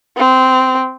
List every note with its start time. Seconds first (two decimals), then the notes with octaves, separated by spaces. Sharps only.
0.17 C4